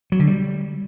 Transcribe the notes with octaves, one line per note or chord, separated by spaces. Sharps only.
F#3
D3
G3